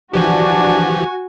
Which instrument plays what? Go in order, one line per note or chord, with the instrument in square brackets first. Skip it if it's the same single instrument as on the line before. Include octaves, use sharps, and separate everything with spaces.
[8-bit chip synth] E3 F3 G4 [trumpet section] D4 [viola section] F#4 [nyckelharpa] G#5